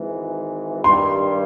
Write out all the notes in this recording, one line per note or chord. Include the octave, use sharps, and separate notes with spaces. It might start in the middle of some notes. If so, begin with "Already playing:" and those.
Already playing: G#1 G#2 E3
G2 D#3 G3 C6